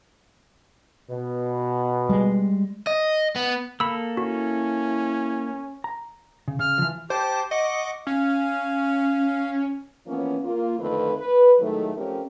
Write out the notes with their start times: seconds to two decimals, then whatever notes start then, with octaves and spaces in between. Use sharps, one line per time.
1.10 B2
2.09 G3 G#3
2.87 D#5
3.36 B3
3.80 A#3 A4 B5 E6
4.17 C#4 E4 F#4
5.84 A#5
6.48 C#3
6.59 C#3 F6
6.78 E3 F3
7.10 G4 C5 A5 D6
7.51 D#5 F#5 C#6 D6
8.07 C#4 F5
10.07 E3 F3 A#3 B3 C#4
10.44 A#3 F4
10.79 F2 D3 D#3 A3 C4 B4
11.16 B4
11.59 A2 D#3 F#3 G#3 A3
11.96 F3 A3 C4 C#4 G4 A#4